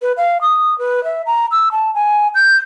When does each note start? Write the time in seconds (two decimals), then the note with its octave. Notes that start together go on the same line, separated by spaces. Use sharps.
0.02 B4
0.17 F5
0.42 D#6
0.79 B4
1.04 E5
1.26 A#5
1.52 E6
1.72 A5
1.95 G#5
2.35 G6